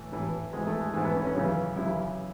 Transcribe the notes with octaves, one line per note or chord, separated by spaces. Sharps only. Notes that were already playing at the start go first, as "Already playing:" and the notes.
Already playing: A2 E3
A2 E3
G#2 E3 G#3
A3
G#3
G#2 E3 A3
B3
C#4
C#4
F#2 C#3 E3 B3
F#2 C#3 E3 E4